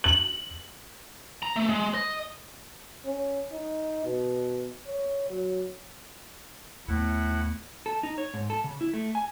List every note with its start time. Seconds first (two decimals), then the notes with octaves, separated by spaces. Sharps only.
0.04 F#7
1.43 A#5
1.56 A3
1.69 G#3
1.94 D#5
3.05 C#4
3.52 D#4
4.05 B2
4.87 C#5
5.30 F#3
6.88 D#2 A2 A3 B3 E4 F#5
7.86 A4
8.03 D#4
8.18 C#5
8.34 G#2
8.50 A4
8.64 C#3
8.81 E4
8.94 A3
9.15 G#5